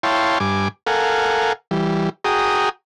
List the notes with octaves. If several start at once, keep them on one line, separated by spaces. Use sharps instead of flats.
E4 C#5 F5 G5 A5 C6
G2 G#5 D6
A4 A#4 F5 F#5 G#5
E3 G3
F#4 G#4 G5 A#5 D#6